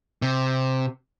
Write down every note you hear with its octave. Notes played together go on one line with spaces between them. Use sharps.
C3